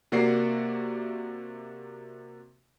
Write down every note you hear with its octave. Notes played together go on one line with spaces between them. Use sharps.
C3 A#3 F#4 D5 C7